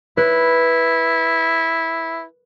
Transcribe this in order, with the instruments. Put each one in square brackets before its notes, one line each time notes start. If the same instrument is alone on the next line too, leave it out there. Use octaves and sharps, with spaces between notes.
[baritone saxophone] E4 [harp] B4